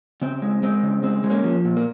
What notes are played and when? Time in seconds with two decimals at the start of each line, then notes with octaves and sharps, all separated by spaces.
0.22 C#3 C4
0.42 G#3
0.63 G#3 C4
0.83 C#3
1.03 G#3 C4
1.24 G#3
1.30 A#3 C#4
1.44 F3
1.65 A#2
1.77 A#3